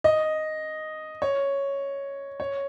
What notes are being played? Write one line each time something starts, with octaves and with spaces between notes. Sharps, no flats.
D#5
C#5
C#5